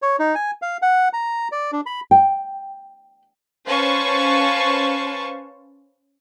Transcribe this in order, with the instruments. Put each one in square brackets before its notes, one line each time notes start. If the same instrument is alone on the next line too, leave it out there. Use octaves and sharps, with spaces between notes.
[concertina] C#5
D#4
G#5
F5
F#5
A#5
D5
D4
B5
[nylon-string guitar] G5
[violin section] C#4 B4 C5 F5 A5 C#6